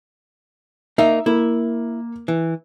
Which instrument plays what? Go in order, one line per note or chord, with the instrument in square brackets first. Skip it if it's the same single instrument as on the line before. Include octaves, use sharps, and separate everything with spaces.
[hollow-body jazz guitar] A#3 D#4 [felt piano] E5
[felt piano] A#3 [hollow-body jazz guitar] E4
[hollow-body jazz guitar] E3